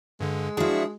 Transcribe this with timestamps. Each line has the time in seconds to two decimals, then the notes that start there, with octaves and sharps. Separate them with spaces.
0.20 G2 D3 G#3
0.57 F3 D4 E4 F#4 G#4